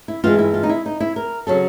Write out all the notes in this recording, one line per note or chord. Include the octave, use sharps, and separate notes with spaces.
E4
G2 E3 G#3 F4
E4
F4
D#4
E4
D#4
E4
A#4
C#3 F#3 A4